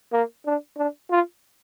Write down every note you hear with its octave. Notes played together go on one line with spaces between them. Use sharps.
A#3
D4
D4
F4